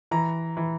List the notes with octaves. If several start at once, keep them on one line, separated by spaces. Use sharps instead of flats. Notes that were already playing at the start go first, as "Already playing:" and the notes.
E3 A#5
E3